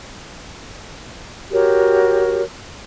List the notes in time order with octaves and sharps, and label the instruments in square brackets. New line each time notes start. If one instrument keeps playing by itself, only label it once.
[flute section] F#4 G4 A#4 C#5